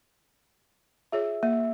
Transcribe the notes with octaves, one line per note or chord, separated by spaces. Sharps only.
F4 G#4 C#5 E5
A#3 E5